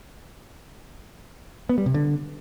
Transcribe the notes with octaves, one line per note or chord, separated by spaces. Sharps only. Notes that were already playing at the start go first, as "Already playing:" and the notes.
B3
G3
C3
D3